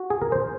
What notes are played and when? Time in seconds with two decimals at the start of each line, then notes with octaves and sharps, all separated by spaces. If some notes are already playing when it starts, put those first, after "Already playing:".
Already playing: F#4
0.10 G#4
0.22 A#4
0.32 C5